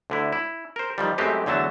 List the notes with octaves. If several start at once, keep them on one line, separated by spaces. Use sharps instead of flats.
D2 D3 E4
E4
A#4 C5
D#3 F3 G3
F#2 G#3 A3 C4 G4 B4
E2 D3 F#3 A3 A5